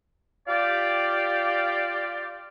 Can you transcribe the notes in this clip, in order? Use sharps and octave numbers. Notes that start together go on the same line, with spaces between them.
F4 G4 D5 F5